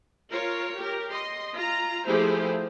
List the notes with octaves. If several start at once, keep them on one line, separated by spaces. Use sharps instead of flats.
F4 A#4 C#5
G4 A#4
D#5 C6
F4 A#5
F3 A3 E4 G4 G#4 C5